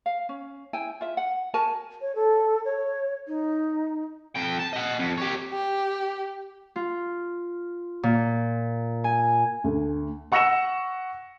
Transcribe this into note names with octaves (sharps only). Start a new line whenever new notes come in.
F5
C#4
E4 G5 G#5
F4 E5
F#5
F#4 A#4 G#5 A5
C#5
A4
C#5
D#4
F2 G5
A5
D#5 F#5
F2
G4 C#5
G4
F4
A#2
G#5
D2
F#5 C#6 E6 A#6 C#7 E7